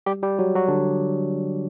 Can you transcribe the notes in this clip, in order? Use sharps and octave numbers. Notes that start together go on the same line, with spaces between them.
G3 G4
G3 G4
F#3 F#4
F#3 F#4
D3 D4